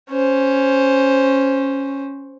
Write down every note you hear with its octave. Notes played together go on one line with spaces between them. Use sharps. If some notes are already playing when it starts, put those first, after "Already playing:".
C#4 C5